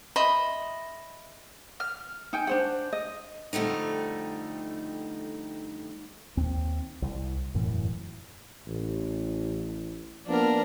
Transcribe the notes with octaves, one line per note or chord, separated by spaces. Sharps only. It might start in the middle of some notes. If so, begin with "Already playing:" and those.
D#5 E5 B5 C6
F6
D#4 G5 G#5
D4 C5 F#5
D#5
F2 D3 G3 A3 D#4
D#2 C4
C2
E1 F#2 A2 E3
A1
F3 A#3 B3 D4 A#4